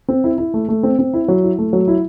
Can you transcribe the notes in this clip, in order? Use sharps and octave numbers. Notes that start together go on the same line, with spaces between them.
C4
E4
E4
A3
A3
C4
C4
E4
F#3
E4
A3
F#3
E4